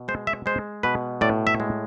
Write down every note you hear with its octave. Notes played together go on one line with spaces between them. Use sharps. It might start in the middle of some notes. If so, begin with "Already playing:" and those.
Already playing: B2
G#3 C5
E5
G#3 C5
B2 B4
A2 D5
E5
G#3